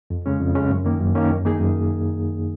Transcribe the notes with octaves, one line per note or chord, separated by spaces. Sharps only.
F2
C#3 G#3 C#4
F2
C#3 G#3 C#4
F#2
D#3 A#3 C#4
F#2
D#3 A#3 C#4
F#2
D#3 A#3 D#4 G#4
F#2